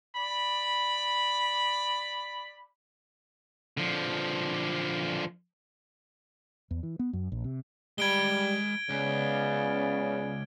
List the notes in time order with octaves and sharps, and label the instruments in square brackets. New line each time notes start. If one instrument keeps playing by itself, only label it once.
[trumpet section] D5 B5
[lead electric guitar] D3 F3
[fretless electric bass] E2
E3
B3
F#2
A#1
C3
[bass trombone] G3 [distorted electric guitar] G#3 B5 [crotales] G#6 D7 G7
[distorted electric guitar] C#2 [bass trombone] C#3 [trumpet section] B3 C#4 D5